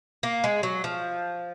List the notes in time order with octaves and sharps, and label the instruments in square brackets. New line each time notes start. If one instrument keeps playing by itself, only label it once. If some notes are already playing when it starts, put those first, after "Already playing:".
[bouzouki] A#3
G#3
F#3
F3